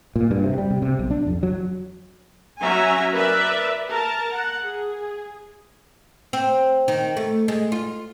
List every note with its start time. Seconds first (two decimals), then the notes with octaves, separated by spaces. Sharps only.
0.16 A#2
0.31 G2
0.44 C3
0.58 G3
0.71 C3
0.82 C3
0.99 B1
1.11 D4
1.27 F2
1.43 F#3
2.61 F#3 C#4 E5 G#5 A#5
3.12 A#4 B4 D5 E5
3.90 A#4 A5
4.33 F#5
4.63 G#4
6.33 C4
6.88 D#3
7.17 A3
7.48 G#3
7.72 F4